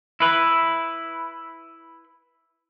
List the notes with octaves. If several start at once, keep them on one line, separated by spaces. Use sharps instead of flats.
E4 B4